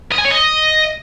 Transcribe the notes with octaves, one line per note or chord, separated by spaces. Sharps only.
D#5
G#5
C#5
D#5